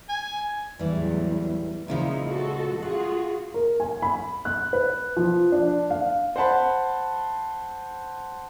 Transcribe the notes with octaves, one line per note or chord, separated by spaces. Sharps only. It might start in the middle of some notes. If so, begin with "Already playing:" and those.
G#5
E2 A2 E3 F#3 G3
A#2 C#3 F3 G#3 D#4 E4
G#3 F#4 A4
F4 F#4 G#4 F#5
A#4
G#5
B5
F#6
B4
F3
D4
F5
C5 F#5 A5 B5